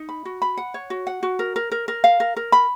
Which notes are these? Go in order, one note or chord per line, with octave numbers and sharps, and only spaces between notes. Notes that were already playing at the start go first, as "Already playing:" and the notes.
Already playing: D#4
B5
F#4
B5
F#5
C#5
F#4
F#5
F#4
A#4
A#4
A#4
A#4
F5
A#4
A#4
B5